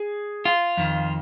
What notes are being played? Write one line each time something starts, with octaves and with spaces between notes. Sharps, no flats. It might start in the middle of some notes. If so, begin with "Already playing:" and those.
Already playing: G#4
F4
F2 D#3